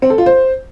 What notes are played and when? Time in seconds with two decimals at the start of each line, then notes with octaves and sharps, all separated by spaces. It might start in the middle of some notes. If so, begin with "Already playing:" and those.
0.02 C4
0.10 A4
0.18 F4
0.26 C5